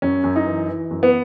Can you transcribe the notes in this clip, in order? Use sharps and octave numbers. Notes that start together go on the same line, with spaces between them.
F#2 C#4
F#2
D#4
E3
E3
F#2
B3